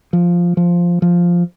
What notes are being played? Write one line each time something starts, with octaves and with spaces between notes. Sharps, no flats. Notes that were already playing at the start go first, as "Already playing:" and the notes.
F3
F3
F3